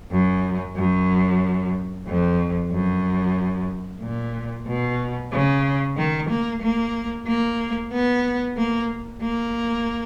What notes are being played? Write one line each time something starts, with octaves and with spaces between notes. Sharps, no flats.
F#2
F#2
F2
F#2
A#2
B2
C#3
D#3
A#3
A#3
A#3
B3
A#3
A#3